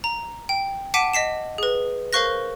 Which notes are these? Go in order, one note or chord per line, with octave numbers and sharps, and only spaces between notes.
A#5
G5
F#5 A5 D6 B6 D7 D#7
D#5 B6 C7 E7
G#4 B4
A#4 C5 F5 C#6 F#6 A#6